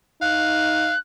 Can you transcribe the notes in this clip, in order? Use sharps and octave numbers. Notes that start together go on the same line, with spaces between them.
D#4 F5 F#6